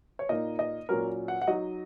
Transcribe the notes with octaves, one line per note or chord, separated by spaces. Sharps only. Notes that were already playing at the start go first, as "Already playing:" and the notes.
C#5
A#2 A#3 D#4 D#5
D#5
A#2 F#3 C#4 A#4
F#5
F#5
F#3 D#4 D#5